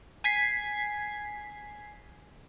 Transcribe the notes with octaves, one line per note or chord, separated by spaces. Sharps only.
G#5 G#6 B6 C7